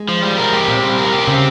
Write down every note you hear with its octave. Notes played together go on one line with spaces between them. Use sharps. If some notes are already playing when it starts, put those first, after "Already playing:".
Already playing: G#3
F3
G3
A#4
G#3 G4
A#2 C4
C#3 G3
A#2 A#4
C3 G4
C#3 C4